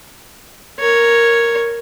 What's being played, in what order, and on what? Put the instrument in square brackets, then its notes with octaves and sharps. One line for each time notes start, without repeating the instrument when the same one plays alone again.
[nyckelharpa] A#4 C#5